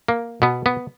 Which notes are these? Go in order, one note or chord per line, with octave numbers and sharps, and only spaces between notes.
A#3
B2 B3
B3